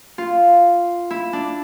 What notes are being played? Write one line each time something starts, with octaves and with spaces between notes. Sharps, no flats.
F4
E4
D4